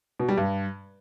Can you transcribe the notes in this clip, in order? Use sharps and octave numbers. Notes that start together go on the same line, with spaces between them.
B2
G3
G2